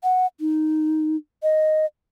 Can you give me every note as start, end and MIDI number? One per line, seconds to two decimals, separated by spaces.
0.03 0.26 78
0.40 1.16 63
1.43 1.86 75